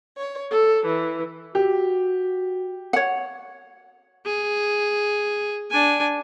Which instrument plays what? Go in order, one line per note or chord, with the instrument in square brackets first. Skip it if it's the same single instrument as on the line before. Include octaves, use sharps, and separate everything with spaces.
[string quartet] C#5
A4
E3
[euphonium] F#4 [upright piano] G4
[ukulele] C#5 F#5
[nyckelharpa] G#4
D4 G#5